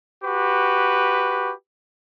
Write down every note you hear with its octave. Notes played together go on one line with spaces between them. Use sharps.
F#4 G4 B4